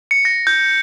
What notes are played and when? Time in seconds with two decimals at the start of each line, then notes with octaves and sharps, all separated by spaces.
0.11 C#7
0.25 A#6
0.47 G6